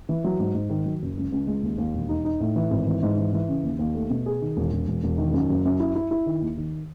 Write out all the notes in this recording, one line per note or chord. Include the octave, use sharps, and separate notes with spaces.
E3
F#3
G#2
G#2
D#3
F#3
F#1
C#2
C#2
G#3
D#2
D#2
E1
D#4
D#4
A2
E3
G#1
E3
G#2
E3
E3
C#3
D#2
D#2
A3
B2
G#4
D#3
E1
E1
E1
E1
D#3
F#2
F#1
F#2
E4
E4
E4
D#3
D#2
D#3